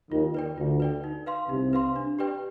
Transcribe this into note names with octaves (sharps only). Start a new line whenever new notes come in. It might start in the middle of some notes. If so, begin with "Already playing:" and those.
D#2 D#3 F4
B4 D5 G5
D2 D3 F4
B4 D5 G5
D#4
B4 F5 C6
C2 C3 D#4
B4 F5 C6
D4
G4 B4 D5 G5